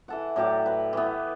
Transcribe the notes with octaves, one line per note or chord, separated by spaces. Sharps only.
E3 A4 F#5
A2 F#3 G4 D5
B4
E3 B3